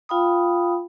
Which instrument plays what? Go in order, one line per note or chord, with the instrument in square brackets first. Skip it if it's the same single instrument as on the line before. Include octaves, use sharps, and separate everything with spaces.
[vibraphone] F4 F5 G5 B5 D#6